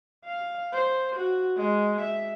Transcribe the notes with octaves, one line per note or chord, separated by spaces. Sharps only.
F5
C5
F#4
G#3
E5